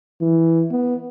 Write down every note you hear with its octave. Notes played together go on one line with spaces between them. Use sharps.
E3
B3